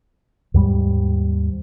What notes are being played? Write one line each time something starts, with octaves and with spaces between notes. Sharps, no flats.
D#2 G#2 G3